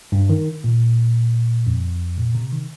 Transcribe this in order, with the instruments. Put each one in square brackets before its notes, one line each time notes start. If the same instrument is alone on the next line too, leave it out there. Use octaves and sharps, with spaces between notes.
[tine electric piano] G2
D#3
A#2
F2
A#2
C3
D#3